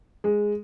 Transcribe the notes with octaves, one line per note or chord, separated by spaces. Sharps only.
G#3